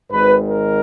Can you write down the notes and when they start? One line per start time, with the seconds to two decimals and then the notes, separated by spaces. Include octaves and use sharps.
0.11 G#1 G#2 D#3 B4
0.46 A#4